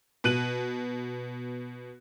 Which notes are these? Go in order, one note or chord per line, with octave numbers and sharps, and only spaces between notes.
B2 F#6 D#7 F#7